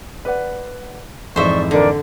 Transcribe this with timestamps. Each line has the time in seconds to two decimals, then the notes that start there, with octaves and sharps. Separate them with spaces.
0.25 B4 D5 F#5
1.36 F2 G#2 E3 C5 D5 E5 C#6
1.71 D3 D4 A#4 D5